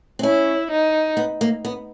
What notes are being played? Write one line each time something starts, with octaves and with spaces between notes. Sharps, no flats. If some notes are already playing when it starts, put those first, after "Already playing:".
C4
C#4 E4
D#4
B3
A#3
B3